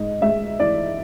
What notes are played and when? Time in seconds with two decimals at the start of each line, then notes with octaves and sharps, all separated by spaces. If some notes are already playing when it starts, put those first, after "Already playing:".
Already playing: G#2 D#5
0.21 G#3 E5
0.60 E3 D5